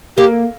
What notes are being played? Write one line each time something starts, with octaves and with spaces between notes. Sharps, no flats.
A#3 G4